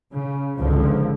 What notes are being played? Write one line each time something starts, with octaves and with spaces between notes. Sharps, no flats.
C#3
G#1 C#2 D3 F3